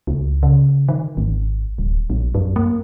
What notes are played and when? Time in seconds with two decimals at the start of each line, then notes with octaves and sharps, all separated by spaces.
0.07 C#2
0.43 C#3
0.88 D#3
1.17 G#1
1.79 D1
2.10 A#1
2.34 F#2
2.56 A#3